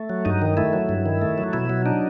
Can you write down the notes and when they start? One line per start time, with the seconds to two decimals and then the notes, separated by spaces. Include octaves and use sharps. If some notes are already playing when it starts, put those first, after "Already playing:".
Already playing: A3
0.10 F#3
0.25 G2 D#4
0.42 D#3
0.57 A3 E4
0.73 F#3
0.89 G2
1.06 D#3
1.22 A3
1.38 F#3
1.53 B2 E4
1.69 F#3
1.86 D4 D#4